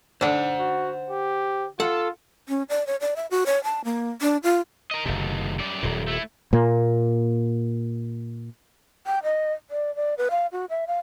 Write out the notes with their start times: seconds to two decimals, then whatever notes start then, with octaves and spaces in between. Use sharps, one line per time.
0.21 D3 D4 C5 F#5
0.59 F#4
1.11 G4
1.80 F4 A4 F#5
2.49 C#4
2.69 D5
2.87 C#5
3.01 D5
3.16 E5
3.31 F#4
3.46 C#5
3.64 A5
3.85 A#3
4.21 D4
4.43 F4
4.91 A#4 D#5
5.05 F#1 C3 D#3 A3
5.59 F#2 G3 D5
5.83 D#1 A#2
6.08 A3 E4
6.53 A#2 A#3
9.07 G5
9.23 D#5
9.70 D5
9.96 D5
10.18 B4
10.31 F5
10.52 F#4
10.70 E5
10.87 F5